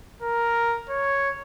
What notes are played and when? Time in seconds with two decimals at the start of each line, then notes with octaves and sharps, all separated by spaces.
0.22 A#4
0.90 C#5